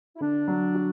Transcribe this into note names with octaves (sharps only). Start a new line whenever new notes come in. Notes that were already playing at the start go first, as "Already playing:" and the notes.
E4
D3 D4
F#3
F#4